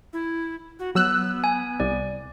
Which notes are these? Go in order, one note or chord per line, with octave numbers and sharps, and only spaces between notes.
E4
F#4
F#3 B3 E6 F#6
G#5
C2 D5